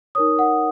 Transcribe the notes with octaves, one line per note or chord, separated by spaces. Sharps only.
D#4 A#4 C#5 D#6
F#5